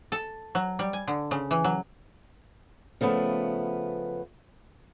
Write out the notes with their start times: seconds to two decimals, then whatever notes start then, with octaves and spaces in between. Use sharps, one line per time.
0.12 A4
0.55 F#3
0.79 G3
0.93 G#5
1.08 D3
1.31 C#3
1.51 E3
1.64 F#3
3.01 C#3 F3 A3 B3